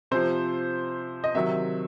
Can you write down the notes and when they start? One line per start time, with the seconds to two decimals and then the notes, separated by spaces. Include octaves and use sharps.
0.11 C3 F3 C5
1.24 D#5
1.34 C3 D#3 F#3 E5